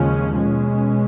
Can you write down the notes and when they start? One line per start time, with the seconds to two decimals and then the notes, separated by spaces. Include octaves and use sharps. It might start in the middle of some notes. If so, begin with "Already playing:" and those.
Already playing: D#2 C#3 F3 G#3 C#4
0.35 B2 G#3 C#4